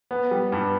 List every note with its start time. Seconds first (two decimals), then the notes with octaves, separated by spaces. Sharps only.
0.11 B3
0.31 G3
0.52 G2